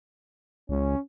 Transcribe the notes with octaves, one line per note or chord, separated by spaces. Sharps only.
C#2 C#4